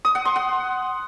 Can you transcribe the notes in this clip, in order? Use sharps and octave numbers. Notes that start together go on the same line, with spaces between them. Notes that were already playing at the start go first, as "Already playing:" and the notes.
D#6
F#5
C6
F#5